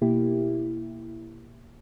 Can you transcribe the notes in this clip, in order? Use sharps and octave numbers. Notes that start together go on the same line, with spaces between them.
B2 A#3 E4 G4